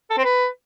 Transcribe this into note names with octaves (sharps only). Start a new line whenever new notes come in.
A4
C4
B4